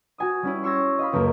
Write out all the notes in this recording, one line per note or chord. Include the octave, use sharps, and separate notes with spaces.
F#4 G#5 D#6
G3 C#4 E4
C6 C#6 E6 G#6 A#6
D#5 F5 B5
C#2 F#2 A3 A#3